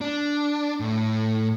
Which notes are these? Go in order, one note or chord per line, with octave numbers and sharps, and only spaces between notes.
D4
A2